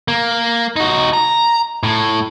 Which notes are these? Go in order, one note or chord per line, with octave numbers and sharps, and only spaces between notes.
A#3
D#4 F#4
A#5
A2